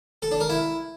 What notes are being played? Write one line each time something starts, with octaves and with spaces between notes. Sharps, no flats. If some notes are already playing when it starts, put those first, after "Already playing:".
A4
D4
A#4
E4